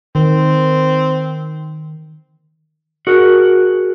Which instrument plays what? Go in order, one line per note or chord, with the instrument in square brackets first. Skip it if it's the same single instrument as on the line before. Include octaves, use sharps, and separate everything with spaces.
[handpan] D#3 [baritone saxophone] C4
[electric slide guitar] F#4 G#4 A#4